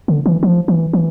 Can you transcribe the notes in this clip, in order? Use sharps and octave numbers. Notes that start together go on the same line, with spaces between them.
D3
E3
F3
E3
E3